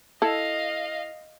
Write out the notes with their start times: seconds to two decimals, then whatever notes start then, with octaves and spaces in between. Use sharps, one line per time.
0.22 E4 A4 D#5 F5